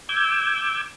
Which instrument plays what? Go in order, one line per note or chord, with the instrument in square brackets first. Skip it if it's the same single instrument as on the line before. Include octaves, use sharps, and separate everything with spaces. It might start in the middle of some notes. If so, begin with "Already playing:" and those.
[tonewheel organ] D6 E6 G6 G#6